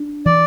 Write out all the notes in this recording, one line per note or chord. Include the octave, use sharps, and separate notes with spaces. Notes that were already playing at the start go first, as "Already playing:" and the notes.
Already playing: D4
E3 D5